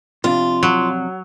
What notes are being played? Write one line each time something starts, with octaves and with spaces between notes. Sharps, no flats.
F2 C3 D4 F4
F#3